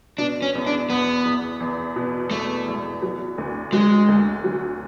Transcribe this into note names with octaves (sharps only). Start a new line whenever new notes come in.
B2 D4
C#4
E2
D4
E2 B3
E2
E2
B2
E2 A3
E2
F#3
D2
F#3 G#3
D2
F#3